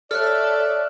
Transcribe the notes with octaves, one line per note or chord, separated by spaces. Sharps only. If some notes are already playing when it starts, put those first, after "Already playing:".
A4 C#5 D5 E5 A5 F6 F#6